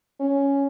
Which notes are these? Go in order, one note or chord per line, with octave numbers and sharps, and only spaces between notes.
C#4